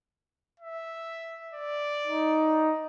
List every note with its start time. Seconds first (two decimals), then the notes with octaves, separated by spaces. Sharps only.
0.60 E5
1.54 D5
2.07 D#4